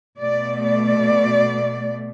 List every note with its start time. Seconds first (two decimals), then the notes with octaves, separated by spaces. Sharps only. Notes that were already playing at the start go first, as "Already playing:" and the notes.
0.18 B2 A3 D5
0.65 D5